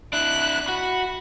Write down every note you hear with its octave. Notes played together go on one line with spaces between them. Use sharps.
D4 E4 F#6
F#4 B5